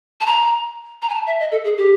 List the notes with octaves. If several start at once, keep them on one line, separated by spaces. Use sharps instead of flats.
A5
A#5
A#5
G#5
A5
E5
D#5
A4
G#4
G4